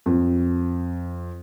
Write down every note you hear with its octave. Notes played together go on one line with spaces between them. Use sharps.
F2